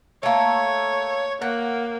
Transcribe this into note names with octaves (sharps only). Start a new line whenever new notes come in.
A3 A#3 C#5
A#3 F#5